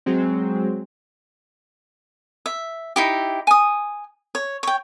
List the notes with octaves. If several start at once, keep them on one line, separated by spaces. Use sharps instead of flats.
F#3 G#3 C4
E5
D#4 E4 G4
G#5 D#6
C#5
C#5 G5